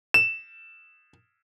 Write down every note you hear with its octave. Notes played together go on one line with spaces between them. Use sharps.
E7